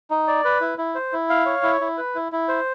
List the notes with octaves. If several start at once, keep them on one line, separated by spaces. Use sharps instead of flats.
D#4
D5
B4
E4
E4
C5
E4
F5
C#5
E4
E4
B4
E4
E4
C5